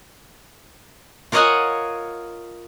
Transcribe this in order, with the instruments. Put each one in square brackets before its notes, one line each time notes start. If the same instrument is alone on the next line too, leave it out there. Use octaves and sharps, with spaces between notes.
[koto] F4 A#4 C#5 D#5 F#5 G#5